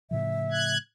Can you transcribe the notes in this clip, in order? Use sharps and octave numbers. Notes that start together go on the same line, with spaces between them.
A2 C#3 F3 E5
F#6 G#6